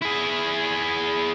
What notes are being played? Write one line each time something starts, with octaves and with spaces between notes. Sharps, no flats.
E4 G#4